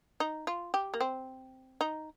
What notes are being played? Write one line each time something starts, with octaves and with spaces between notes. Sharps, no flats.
D#4
F4
G4
A#3
C4
D#4